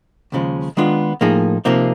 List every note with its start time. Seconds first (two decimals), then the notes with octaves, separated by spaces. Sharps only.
0.32 D#2 C#3 F3 G#3
0.77 D#3 G#3 B3 D4 F4
1.21 A2 F3 A#3 D#4 G#4
1.65 C3 F3 A#3 D#4